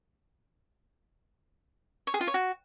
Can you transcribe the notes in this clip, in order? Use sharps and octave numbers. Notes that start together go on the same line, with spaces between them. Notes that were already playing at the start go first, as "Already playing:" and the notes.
C#5
G#4
F4
C#5
F#4